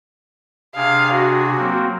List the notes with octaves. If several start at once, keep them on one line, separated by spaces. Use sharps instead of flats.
C3 D4 G#4 F5
F#4
F#3 A#3 C4